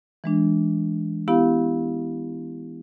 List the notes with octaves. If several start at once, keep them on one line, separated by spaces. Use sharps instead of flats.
E3 G#3 D4
B3 E4 G4 F5